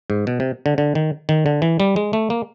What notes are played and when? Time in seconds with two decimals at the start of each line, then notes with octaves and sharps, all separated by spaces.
0.10 G#2
0.27 B2
0.40 C3
0.66 D3
0.78 D3
0.95 D#3
1.29 D#3
1.46 D3
1.62 E3
1.80 G3
1.96 G#3
2.13 A3
2.30 A#3